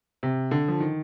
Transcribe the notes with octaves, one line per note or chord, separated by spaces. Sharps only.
C3
D3
F3
D#3